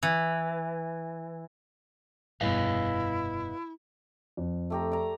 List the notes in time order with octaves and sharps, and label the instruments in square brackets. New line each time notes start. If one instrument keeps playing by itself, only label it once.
[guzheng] E3
[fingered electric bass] F1 G2 B2 [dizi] E4 [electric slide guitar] B4 D#5 F5
[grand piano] F2
[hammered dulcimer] A3 G4 A#5
D5 A#5